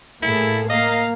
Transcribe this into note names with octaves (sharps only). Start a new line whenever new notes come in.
A2 A#3 E4 G#4 A4
A#3 D#5 F5 A#5